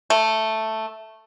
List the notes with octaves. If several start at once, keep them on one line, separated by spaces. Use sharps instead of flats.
A3